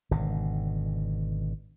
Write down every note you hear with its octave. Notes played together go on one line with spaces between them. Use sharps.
G#1 B2 D3